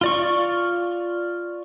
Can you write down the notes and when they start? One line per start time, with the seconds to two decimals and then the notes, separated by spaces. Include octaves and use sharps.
0.01 F4 D5 C#6